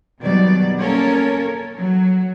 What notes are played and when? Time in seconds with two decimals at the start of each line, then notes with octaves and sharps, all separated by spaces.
0.21 B2 D#3 F#3 G3 D5
0.81 A#3 C#4 A4 A#4 C#5
1.77 F#3